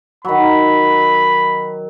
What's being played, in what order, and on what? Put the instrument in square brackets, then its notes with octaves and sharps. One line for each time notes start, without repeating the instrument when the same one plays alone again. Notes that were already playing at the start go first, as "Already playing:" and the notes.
[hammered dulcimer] D#3 F#3 [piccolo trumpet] B5